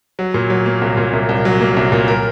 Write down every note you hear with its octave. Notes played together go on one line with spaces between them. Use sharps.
F#3
A#2
F#3
A#3
C2
A#2
C2
C2
F#3
A#3
C2
A#2
A#4